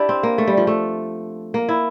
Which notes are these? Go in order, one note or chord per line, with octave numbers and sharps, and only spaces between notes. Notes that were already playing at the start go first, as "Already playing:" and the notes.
Already playing: D4 E4 G4
C4
A#3
A3
G3
F3
A3
A#3
E4